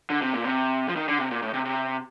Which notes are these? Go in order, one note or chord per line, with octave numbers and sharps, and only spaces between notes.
D3
C3
A#2
C3
F3
D#3
D3
C3
A#2
A2
C3
C3